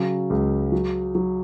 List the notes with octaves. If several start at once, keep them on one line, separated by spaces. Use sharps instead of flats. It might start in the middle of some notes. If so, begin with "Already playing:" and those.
Already playing: C#3 F#3
C#2
F#3
F#3